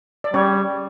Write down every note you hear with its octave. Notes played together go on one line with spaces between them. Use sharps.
D5
G3 C#4 C#5